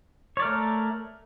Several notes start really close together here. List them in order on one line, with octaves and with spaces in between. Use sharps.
C#5 D5 A#4 A3